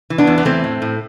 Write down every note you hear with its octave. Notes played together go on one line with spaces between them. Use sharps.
E3
B3 D4
E2
B3
E3 A3 C4
A2
A2